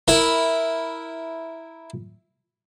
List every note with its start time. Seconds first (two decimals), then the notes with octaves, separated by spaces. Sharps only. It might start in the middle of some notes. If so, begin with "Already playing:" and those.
0.08 E4 A#4